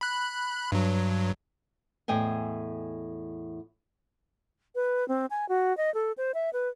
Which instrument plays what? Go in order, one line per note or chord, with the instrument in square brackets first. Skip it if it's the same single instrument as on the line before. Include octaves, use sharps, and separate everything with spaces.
[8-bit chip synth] B5 F#6
G2 F#3
[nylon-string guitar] E2 A2 D#5 G5 G#5
[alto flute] B4
C4
G#5
F#4
D#5
A4
C5
E5
B4